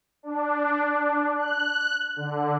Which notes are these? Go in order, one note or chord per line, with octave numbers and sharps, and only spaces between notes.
D4
F#6
D3